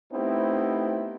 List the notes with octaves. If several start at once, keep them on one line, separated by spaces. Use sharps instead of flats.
A3 B3 C4 D#4 E4 G4